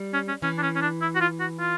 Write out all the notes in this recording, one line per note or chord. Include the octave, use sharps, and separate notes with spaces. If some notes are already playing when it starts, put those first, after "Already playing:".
Already playing: G3
C#4
C#4
E3 C#4
D4
C#4
C#4
D4
E4
F#4
F4
F#4
F4